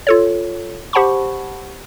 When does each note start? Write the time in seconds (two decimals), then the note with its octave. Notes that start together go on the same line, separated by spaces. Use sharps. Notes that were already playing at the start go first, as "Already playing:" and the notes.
0.07 F4 A4 C#5
0.93 G4 C5 F#5 A5 B5 C#6